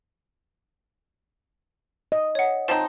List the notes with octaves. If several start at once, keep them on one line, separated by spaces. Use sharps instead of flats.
D#5
C#5 F#5
F3 C4 D#4 A5